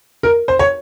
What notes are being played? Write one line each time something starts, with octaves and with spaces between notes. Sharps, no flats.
A#4
C5
C#5